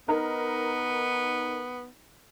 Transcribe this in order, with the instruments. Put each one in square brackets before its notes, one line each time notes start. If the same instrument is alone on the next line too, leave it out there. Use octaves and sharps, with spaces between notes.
[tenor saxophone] B3 [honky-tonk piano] D#4 A#4